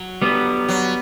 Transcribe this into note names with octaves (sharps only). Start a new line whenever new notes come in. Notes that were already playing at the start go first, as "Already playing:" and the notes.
Already playing: F#3
G3 B3
F#3